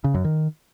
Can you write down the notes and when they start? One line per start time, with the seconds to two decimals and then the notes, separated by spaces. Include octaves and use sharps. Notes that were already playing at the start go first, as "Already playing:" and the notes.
0.04 C#3
0.14 F#2
0.24 D#3